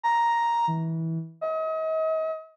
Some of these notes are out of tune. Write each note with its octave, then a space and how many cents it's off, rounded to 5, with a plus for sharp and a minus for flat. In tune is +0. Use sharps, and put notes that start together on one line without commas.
A#5 +5
E3 -20
D#5 +40